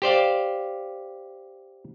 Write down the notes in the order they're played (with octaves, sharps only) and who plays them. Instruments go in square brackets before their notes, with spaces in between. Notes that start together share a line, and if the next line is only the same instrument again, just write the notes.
[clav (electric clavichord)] G4 C5 D5 F5